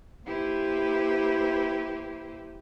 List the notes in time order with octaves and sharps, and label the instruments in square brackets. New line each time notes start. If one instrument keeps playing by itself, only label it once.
[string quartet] A#3 E4 G4 B4 C5